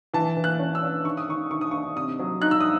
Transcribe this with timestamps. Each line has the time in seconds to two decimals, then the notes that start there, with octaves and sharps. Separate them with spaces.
0.14 E3 A5
0.37 E3
0.44 F#6
0.59 C#4
0.75 E6
0.83 C#4
1.05 D#3 C#6
1.17 D#6
1.28 D#3 C#6
1.51 D#3 C#6
1.61 D#6
1.71 D#3 C#6
1.96 C3 D#6
2.19 F#3
2.42 D#4 F#6
2.51 E6
2.61 D#6